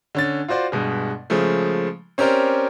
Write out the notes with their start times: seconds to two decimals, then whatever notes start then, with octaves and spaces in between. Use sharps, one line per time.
0.15 D3 C#4 A6
0.48 F4 F#4 C5 D5
0.72 G2 B2 G#3
1.30 C#3 F3 G#3 A3
2.18 C4 C#4 G4 A#4 C5 D5